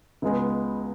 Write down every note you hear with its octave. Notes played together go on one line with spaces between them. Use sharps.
C#2 C#3 G#3 B3